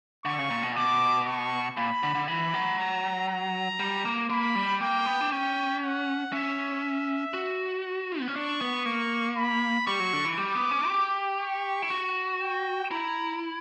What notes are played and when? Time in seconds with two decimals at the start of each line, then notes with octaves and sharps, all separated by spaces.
0.25 D3 C#6
0.39 C#3
0.50 A#2
0.63 B2
0.72 A#2
0.76 B2 D6
1.26 C#6
1.77 A#2 B5
2.03 D3
2.15 D3
2.28 E3 B5
2.54 F#3
2.78 A#5
3.29 A#5
3.80 G3
4.05 A#3
4.30 A#3 B5
4.55 G3
4.81 A#3 G5
5.06 B3
5.21 D4
5.32 C#4 G5
5.83 F#5
6.32 C#4 E5
7.34 F#4
8.20 B3
8.28 C#4
8.36 D4 C#6
8.61 B3
8.85 A#3 C#6
9.37 B5
9.87 G3 C#6
10.00 F#3
10.13 D3
10.25 E3
10.38 G3 D6
10.55 B3
10.71 C#4
10.88 G4
11.40 C#6
11.82 E4
11.90 F#4
12.41 G5
12.91 E4 A#5